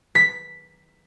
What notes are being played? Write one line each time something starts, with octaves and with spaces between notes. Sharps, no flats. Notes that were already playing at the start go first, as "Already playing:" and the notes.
B6